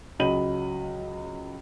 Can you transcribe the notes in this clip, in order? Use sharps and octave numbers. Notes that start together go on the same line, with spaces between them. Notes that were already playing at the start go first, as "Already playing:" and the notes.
C#2 F#3 D#5 B5 D#7 F#7